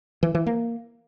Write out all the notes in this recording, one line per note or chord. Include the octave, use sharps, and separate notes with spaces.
E3
E3
A#3